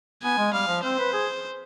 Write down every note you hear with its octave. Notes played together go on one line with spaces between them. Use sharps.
B3 G#5
G#3
G3 F5
F3
C4 C5
B4
G#4